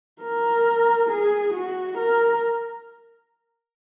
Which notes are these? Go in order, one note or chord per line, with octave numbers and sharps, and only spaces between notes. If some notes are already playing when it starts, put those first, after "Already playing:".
A#4
G#4
F#4
A#4